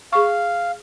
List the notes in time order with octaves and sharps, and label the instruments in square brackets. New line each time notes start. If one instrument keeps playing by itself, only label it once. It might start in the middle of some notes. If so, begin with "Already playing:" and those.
[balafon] G#4 C#6 [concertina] F5